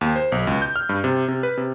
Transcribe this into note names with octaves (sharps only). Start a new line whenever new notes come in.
D#2
C5
B1
C#2
G6
F6
G2
C3
C3
B4
C3